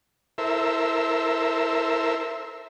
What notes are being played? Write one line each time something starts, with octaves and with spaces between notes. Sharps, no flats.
E4 A4 A#4 C5 E5